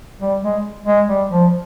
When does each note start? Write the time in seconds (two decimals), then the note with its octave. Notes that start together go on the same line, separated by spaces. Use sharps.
0.20 G3
0.42 G#3
0.86 G#3
1.09 G3
1.31 F3